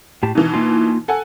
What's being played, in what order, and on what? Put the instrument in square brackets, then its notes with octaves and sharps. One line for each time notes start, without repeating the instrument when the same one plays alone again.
[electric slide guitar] A2 G4 A5
[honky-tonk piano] B2 E3 [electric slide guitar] D#4
[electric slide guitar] A#3 D#4 F4
[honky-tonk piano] A4 F#5 G#5